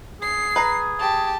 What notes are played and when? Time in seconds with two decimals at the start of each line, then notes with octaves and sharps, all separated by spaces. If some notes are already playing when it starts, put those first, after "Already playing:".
0.22 G#4 C7
0.56 B4 A#5
0.99 G4 A5